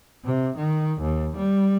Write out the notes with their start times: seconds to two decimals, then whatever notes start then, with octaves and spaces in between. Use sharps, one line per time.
0.25 C3
0.57 D#3
1.01 D#2
1.36 G3